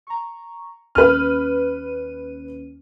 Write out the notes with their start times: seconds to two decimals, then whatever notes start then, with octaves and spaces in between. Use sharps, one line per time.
0.07 A#5 C#6
0.95 D#2 C#4 B4 F6 D#7